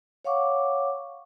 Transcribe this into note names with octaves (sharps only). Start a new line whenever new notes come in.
C#5 F5 F#5 C#6 D6